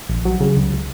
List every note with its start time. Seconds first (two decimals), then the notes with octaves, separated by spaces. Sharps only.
0.09 A#1
0.25 F#3
0.41 C#3
0.56 C#2